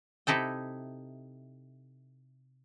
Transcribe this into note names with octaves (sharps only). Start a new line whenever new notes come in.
C3 D#4 E4 A4 G5